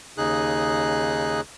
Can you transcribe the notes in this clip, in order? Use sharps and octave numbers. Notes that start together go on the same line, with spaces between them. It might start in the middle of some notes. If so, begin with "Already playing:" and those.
D#2 C#3 D#4 G#4 F#6